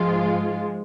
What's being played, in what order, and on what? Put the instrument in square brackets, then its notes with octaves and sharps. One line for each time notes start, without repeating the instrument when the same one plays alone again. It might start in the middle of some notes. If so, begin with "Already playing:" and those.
Already playing: [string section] G#2 F3 G#3 F4